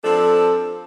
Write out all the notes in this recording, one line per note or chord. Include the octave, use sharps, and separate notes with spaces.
F3 C4 D4 A4